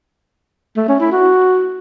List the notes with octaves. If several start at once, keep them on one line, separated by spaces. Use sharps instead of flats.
A3
C#4
E4
F#4